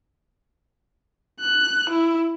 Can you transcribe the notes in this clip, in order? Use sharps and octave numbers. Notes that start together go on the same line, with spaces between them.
F#6
E4